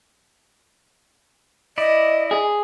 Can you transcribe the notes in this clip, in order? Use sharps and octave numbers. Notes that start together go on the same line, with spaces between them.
E4 D5 D#5
G#4